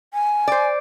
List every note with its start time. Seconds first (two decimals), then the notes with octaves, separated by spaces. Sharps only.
0.14 G#5
0.48 C5 D5